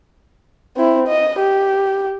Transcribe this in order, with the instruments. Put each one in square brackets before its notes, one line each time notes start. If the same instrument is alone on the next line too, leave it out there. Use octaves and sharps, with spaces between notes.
[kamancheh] C4 E4
D#5
G4